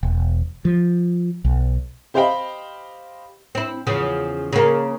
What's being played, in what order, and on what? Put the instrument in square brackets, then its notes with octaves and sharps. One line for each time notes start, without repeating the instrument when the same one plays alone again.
[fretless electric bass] E1
F3
B1
[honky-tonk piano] G4 C5 D#5 F5 G5 B5
[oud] C4 E4
E2 C#3 F3
C#3 A#3